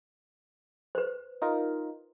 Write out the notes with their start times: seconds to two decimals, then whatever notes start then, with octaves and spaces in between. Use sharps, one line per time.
0.95 B4 C5
1.42 D#4 F4 A#4